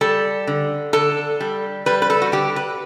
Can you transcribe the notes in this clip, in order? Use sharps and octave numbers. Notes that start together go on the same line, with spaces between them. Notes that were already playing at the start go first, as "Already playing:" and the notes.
G3 A4
D3
D3 A4
G3
G3 B4
B4
A4
F#4
D3 G4
B4